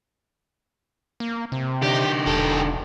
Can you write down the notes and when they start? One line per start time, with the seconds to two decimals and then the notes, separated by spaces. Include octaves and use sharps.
1.20 A#3
1.52 C3
1.83 D3 D#4 G4
2.27 E1 G4 A4